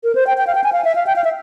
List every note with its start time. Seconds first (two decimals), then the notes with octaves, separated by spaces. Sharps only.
0.04 A#4
0.15 C5
0.27 G5
0.38 G5
0.47 F5
0.55 G5
0.64 G#5
0.73 F5
0.84 E5
0.95 F5
1.07 G5
1.16 F5
1.24 E5